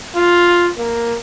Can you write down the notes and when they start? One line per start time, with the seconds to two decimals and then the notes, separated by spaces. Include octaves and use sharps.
0.16 F4
0.77 A#3